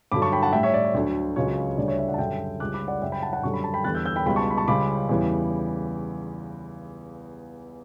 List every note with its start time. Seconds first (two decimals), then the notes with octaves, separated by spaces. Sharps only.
0.12 G2 D3 F#3 B5 D6
0.22 A5 C#6
0.32 G5 B5
0.42 F#5 A5
0.53 A2 G3 E5 G5
0.63 C#5 E5
0.74 D5
0.84 C#5
0.94 D2 D3 F#3
1.36 C#2 C#3 F#3 C#5
1.78 D2 C#3 G3 D5
1.88 C#5 E5
1.98 C#5 E5
2.08 D5 F#5
2.14 A5
2.18 F#2 D3 G3 E5 G5
2.60 C#2 C#3 G3 D6 F#6
2.74 B5 D6
2.88 D5 F#5
3.02 F#2 C#3 G3 E5 G5
3.12 G5 B5
3.23 F#5 A5
3.33 F#5 A5
3.43 F#2 D3 G3 C#6
3.54 B5
3.64 A5
3.74 G5 B5
3.84 E2 D3 G3 F#6 A6
3.95 E6 G6
4.06 E6 G6
4.16 G5 B5
4.26 C#2 B2 G3 G5 B5
4.36 A5 C#6
4.51 B5
4.57 A5 C#6
4.67 C#2 C#3 G3 B5 D6
5.09 E2 C#3 E3 G3